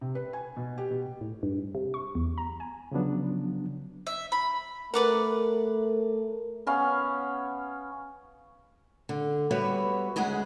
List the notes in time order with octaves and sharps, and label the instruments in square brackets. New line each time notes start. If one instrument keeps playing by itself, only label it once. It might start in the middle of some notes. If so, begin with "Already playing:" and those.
[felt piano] C3
B4
G#5
B2
G4
B2
[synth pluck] A2
G2
C3
C#6
E2
A#5
G#5
[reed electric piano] C#3 F3 F#3 B3 D4
[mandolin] E5
B5
[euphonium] A3 [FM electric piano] A#4 [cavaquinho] B4 D5 F#5
[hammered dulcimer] B3 C#4 F5
[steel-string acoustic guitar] D3
G3 B3 F#4 B4 C#5 E5
D2 C#3 G#3 G#4 F#5